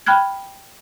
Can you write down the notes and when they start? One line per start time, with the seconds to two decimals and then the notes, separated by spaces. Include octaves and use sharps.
0.06 G5 B5 F6 F#6 G#6